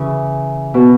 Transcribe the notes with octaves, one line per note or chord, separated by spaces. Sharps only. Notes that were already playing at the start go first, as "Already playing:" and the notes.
Already playing: C#3 E3
B2